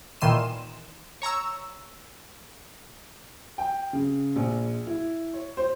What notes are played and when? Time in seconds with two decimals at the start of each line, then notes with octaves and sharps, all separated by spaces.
0.21 A#2 D#3 E3 C6 D#7 E7
1.22 C#5 A#5 C#6 E6
3.58 G5
3.93 C#3
4.36 A#1
4.87 E4
5.33 C#5
5.57 C5